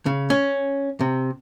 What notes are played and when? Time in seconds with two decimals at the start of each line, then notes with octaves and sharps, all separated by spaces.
0.06 C#3
0.30 C#4
1.01 C3